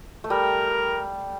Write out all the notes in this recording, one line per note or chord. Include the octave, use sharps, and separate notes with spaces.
A3
G3 A#4